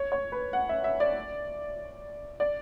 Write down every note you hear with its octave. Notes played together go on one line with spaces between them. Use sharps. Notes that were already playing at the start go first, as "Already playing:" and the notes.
Already playing: C#5
C#5
B4
F#5
E5
E5
D5
D5